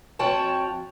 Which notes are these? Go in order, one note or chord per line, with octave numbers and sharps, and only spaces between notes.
F2 F3 F#4 C#5 G5 A5